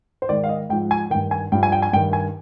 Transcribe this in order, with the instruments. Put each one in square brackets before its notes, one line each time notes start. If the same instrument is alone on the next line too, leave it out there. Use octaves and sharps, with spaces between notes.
[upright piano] C5
G#2 D#3 D5
F5
D#5
G#2 G5
F3
G#5
D#3 G5
G2
G#5
G2 F3 G5
G#5
G5
G#5
G2 G5
D#3
G#5